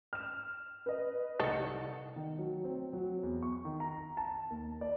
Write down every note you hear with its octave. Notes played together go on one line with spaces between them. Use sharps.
F6 E7
B4 D#5
C2 D#3 A4 C#7
D#3
F#3
C4
F#3
E2
C#6
D#3
A#5
A5
D#2
D5